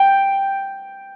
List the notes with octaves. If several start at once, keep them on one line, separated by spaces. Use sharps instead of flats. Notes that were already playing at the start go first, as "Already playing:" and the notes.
Already playing: G5